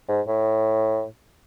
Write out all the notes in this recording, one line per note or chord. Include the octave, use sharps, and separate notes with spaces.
G#2
A2